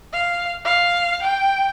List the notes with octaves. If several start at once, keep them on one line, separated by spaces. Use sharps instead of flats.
F5
F5
G5